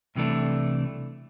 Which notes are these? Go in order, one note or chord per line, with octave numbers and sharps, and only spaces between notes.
C2 C3 E3 A3 D4